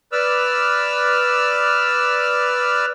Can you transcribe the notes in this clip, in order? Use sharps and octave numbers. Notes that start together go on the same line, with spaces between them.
B4 D5 E6 F6